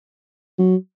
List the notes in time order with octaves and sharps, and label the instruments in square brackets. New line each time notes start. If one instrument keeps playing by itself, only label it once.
[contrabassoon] F#3